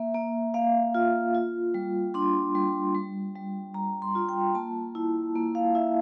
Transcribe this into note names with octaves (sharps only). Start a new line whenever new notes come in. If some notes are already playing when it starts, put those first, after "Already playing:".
Already playing: A#3 E5
A#3
A#3 F5
F4
F4
G3
D4 C6
G3
G3
G3
G3 A#5
C6
F4
G5
A#3 A5
E4
A#3
F5
E4 E5